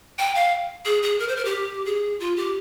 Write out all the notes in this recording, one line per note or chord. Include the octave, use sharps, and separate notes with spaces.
G5
F5
G#4
G#4
A#4
C5
A#4
G4
G#4
F4
G4